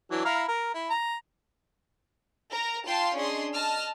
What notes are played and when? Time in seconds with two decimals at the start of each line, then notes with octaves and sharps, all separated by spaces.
0.11 E3 F#3 D4
0.25 E4 F5 A#5
0.48 A#4
0.74 E4
0.90 A#5
2.51 A#4 A#5
2.86 F4 F5 G5 A5 C6
3.16 C#4 D4 G#4 D#5 C6
3.53 D#5 A5 F6